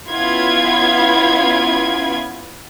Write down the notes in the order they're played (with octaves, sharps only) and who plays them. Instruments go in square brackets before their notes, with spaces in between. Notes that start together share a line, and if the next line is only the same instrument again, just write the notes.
[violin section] B3 C#4 E4 F4 B5 G#6